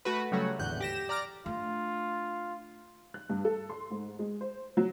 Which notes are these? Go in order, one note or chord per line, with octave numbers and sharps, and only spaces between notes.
A3 F#4 B4
C#3 F#3 G3 A3 F#4 C#5
G#1 E2 A2 D3 F#6 G6
G4 A#6 E7
D5 A#5 D6 F6 A#6
A3 D4 F4
F#6
G2
A4
C6
G#2
G#3
C5
F#3